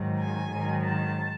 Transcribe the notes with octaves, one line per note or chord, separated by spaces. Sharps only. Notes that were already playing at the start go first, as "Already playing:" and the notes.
Already playing: G#2 D#3 F#3
G#5
G#2 D#3 F#3
A5